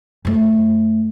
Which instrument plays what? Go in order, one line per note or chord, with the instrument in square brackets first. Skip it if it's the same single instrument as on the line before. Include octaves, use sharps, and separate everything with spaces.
[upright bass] F#2 A3